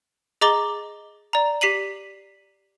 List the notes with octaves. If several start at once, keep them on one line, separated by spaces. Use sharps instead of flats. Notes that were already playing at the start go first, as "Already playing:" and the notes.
G#4 D#5 A#5 D6 A6 G7
D5 A#5
G4 B6 C7 D#7 F#7